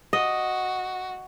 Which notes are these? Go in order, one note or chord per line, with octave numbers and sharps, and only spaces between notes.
F#4 D#5